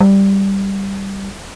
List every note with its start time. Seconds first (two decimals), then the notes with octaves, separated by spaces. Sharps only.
0.01 G3